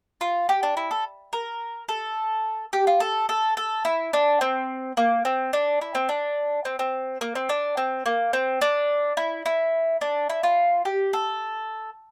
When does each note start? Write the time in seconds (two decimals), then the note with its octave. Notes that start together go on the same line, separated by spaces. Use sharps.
0.21 F4
0.49 G4
0.63 D4
0.77 E4
0.91 A4
1.33 A#4
1.89 A4
2.73 G4
2.87 F4
3.00 A4
3.29 A4
3.57 A4
3.85 E4
4.13 D4
4.41 C4
4.97 A#3
5.25 C4
5.53 D4
5.81 E4
5.95 C4
6.09 D4
6.65 C4
6.79 C4
7.21 A#3
7.35 C4
7.49 D4
7.77 C4
8.06 A#3
8.33 C4
8.61 D4
9.17 E4
9.46 E4
10.01 D4
10.30 E4
10.43 F4
10.85 G4
11.13 A4